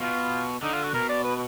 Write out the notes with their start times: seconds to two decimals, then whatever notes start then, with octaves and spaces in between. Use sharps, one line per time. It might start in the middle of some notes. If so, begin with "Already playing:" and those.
0.01 B2 F4
0.63 D3 D#4
0.73 F4
0.84 F#4
0.93 B2 A#4
1.09 D5
1.24 B4